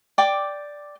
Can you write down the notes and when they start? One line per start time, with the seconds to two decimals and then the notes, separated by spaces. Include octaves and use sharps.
0.18 D5 G5 D6